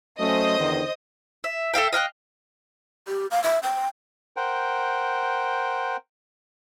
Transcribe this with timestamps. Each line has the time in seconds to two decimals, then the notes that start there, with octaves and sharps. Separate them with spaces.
0.20 F#3 A3 C#4 C5 D#5 D#6
0.59 E2 D3 D#3
1.44 E5
1.74 A4 E5 F5 G5
1.93 D#5 F5 G5 F#6
3.07 G4
3.31 F5
3.44 E5
3.63 G5
4.36 A#4 C5 F#5 G5